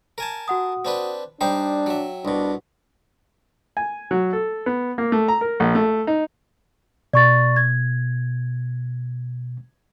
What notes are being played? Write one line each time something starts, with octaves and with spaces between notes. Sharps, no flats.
A#4 G#5 A5
F#4 F#5 D#6
C4 D4 B4
G3 D4 D#4 C5 G5
F#3 E5
C2 B2 D4
G#5
F#3
A4
B3
A#3
A3
A#5
A#4
A#1
A3
D#4
B2 D5 C#6 A6
G#6